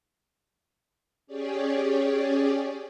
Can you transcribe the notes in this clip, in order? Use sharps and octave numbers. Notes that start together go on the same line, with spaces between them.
C#4 G4 G#4 C#5 D5